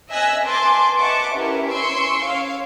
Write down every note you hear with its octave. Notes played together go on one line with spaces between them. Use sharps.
D#5 E5 G#5 E6 F#6 A#6
B4 G#5 A5 C6 D6
D#5 E5 F#5 A5 C#6 D6
C#4 E4 G4 A#4 B4
C#4 C6 C#6 E6 D7
C#5 F5